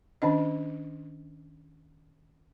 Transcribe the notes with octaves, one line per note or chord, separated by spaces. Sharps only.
D#3 C#4 D4 D#5